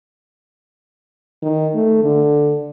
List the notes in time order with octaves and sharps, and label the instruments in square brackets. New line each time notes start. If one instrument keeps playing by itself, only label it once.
[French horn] D#3
A3
D3